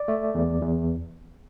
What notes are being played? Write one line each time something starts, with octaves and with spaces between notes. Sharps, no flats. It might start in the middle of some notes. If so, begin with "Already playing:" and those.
Already playing: D5
A3
E2
E2